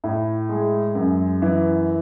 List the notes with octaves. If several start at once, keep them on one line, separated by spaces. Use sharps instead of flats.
A2
G#3
F#2
E3